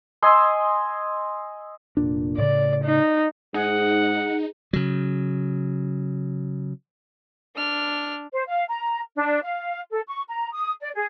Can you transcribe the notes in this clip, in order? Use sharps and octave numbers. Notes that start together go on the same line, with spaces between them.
D#5 G#5 C6 E6
F1 A#2 D4
A2 C#3 D5
D#4
G#2 D#4 G#4 F#5
C#3 F#3
D4 F6
C5
F5
A#5
D4
F5
A4
C#6
A#5
D#6
D5
G#4